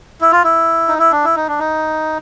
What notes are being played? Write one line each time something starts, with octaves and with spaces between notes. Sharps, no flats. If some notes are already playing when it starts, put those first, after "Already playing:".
E4
F4
E4
D#4
E4
D4
E4
D#4
D4
D#4